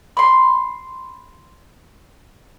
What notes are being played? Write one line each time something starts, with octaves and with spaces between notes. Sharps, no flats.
B5 C6